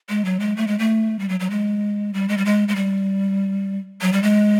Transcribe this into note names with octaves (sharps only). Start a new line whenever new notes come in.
G#3
F#3
G#3
A3
G#3
A3
G3
F#3
F#3
G#3
G3
G#3
G3
G#3
G#3
G3
F#3
G3
G#3